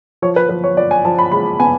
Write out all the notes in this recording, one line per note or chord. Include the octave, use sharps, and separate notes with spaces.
F3 C#5
B4
F3 B4
C#5
F3 D5
G#5
F3 A5
B5
G#3 B5
B3 G#5